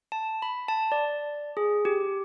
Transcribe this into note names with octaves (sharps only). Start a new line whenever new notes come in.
A5
B5
A5
D5
G#4
G4